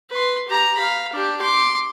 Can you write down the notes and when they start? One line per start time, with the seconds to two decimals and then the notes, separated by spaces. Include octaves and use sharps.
0.11 B4 C6
0.48 G4 A#5
0.78 F5 B5
1.12 D4 G4
1.41 C6 D6